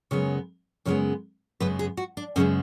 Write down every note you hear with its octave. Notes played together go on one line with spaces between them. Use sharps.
F#2 C#3 G#3 B3 C#5
F#2 C#3 G#3 B3 C#5
F#2 C#3 G#3 B3 B4
G#4
F#4
D4
F#2 C#3 G#3 B3 C#4